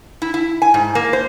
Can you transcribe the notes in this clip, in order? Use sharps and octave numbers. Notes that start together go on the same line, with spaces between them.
E4
E4
G#5
G#2
A#3
C5